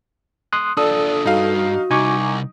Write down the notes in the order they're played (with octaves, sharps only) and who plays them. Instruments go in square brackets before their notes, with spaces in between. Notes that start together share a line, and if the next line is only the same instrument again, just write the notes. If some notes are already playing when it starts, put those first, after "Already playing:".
[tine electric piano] C6 D#6 F#6
[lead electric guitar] D4 F4 [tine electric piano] A4 [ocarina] D5 [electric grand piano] D#6
[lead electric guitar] G2 [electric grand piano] D#4 F5 [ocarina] F#4
[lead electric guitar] C2 [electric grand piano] D#4 [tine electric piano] G#5 C#6 D6